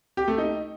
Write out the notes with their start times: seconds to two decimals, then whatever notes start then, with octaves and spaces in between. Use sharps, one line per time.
0.17 G4
0.28 A3
0.38 D#4